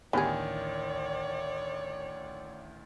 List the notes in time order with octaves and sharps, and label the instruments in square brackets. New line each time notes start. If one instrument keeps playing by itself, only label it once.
[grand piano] A1 D2 D#3 [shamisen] B3 G4 G#4 [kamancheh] C#5 D5